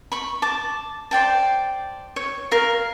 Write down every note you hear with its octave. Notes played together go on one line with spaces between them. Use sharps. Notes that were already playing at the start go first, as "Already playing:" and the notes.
B5 C#6
A5 D6
C5 D5 G5 A5
C#5
A#4 F5